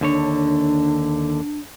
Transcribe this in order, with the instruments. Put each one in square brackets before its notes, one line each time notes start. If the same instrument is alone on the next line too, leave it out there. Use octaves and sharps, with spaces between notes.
[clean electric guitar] D#2 D3 C#5 [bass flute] D4